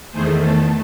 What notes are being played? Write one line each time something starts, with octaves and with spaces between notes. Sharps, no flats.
E2 D#3 A3 G#4 C5
A4